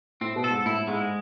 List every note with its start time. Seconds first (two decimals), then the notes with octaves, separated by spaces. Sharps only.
0.21 A2 C4
0.36 B2
0.44 A4
0.50 G#2
0.66 A2 E4
0.87 G#2 G#3